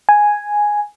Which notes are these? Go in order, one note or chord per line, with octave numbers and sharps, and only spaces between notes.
G#5